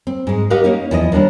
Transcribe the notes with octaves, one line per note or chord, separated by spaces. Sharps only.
C4
G#2 G#3
G4 A#4 B4 D#5 F5 F#5
A#3 C#4 D#4
E2 F3 E4 D#5
D#2 G3 D4 G4 A#4